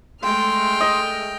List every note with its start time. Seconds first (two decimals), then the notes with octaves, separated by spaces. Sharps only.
0.23 G#3 A3 G5 C6 F6
0.81 D#5